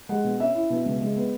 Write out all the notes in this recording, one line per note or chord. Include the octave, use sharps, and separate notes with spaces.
G#3 F#5
B2
C#4 E5
E4
B2
C#2
G#3
B3